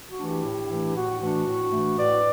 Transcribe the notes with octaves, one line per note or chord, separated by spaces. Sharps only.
F#4
E3 A3 D4
E4 G4
A2
E3 A3 D4
A2 F#4
E3 A3 D4 F#4
A2
E3 A3 D4
A2 B4 D5